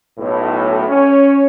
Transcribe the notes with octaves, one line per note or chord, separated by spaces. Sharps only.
B1 A2
C#4 C#5